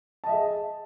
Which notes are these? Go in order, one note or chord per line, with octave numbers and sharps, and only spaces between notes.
G#4 D#5 E5 A5